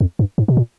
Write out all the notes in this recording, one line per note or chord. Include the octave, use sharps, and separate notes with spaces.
F2
G2
G#2
B2
A#2